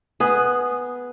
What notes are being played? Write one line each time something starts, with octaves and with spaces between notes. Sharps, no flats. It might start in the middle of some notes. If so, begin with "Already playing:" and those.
B3 G#4